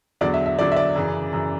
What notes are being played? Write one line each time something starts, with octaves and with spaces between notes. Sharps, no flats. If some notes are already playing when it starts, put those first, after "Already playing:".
E2 D3 F#3 D5
E5
E5
E2 D3 F#3 D5
E5
D5
F#2 C#3 E3
F#2 C#3 E3